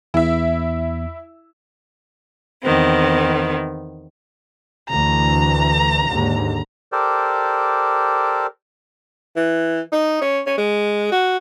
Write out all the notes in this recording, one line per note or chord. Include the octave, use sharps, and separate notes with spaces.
E2 E4 E5
E2 D#3 B3 C4
D2 E3 A#5
D#2 G#2 D3
G4 A4 A#4 C5 D5
E3
D#4
C#4
C#4
G#3
F#4